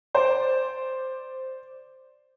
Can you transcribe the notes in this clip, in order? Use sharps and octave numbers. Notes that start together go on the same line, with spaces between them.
C5 D5